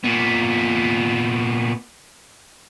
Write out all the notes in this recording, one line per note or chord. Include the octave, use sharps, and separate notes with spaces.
A#2 B3